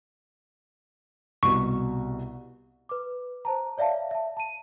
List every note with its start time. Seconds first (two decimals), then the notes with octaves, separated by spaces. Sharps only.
1.43 C2 B2 C#6
2.89 B4 D6
3.45 C5 A5 A#5
3.78 C#5 D5 E5 F5 A5
4.11 E5 A5
4.37 A5 D#7